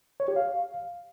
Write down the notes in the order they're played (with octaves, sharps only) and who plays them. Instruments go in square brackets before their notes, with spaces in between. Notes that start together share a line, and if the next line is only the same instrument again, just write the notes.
[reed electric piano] C#5
G4
F5